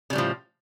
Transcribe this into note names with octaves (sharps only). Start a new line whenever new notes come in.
A2 C#3 F3 G3